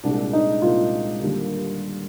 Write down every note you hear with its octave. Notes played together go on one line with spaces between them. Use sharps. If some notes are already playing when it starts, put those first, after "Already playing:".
C2 A#2 G#3 D4
D#4
C2 A#2 G#3 F4
D#2 D3 G3 A#3